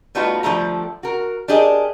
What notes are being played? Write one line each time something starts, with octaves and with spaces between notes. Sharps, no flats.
G3 A3 B3 D#4 F4 F#4
D3 F3 G3 A3 A#5
F#4 A#4
D4 G4 G#4 A#4 D#5